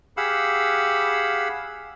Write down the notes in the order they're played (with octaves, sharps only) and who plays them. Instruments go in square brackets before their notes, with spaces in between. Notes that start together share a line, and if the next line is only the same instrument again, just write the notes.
[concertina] G4 G#4 F5 F#5 B5 E6